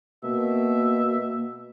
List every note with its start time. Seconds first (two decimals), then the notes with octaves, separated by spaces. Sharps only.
0.23 B2 A#3 E5